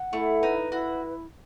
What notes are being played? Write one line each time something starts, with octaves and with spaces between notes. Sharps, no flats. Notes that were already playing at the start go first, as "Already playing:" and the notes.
Already playing: F#5
A3 E4
D#4 B4
E4 F#4